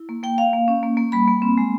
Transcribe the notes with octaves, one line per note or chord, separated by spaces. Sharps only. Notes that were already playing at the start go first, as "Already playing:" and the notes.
Already playing: E4
A#3
A#3 G5
A#3 F5
A#3
C#4
A#3
A#3
G3 B5
A#3
C4
G#3